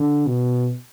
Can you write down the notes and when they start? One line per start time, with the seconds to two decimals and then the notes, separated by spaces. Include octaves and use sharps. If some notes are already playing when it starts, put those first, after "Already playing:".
Already playing: D3
0.26 B2